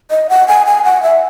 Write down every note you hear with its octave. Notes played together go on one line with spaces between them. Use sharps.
D#5
F#5
G#5
G#5
F#5
E5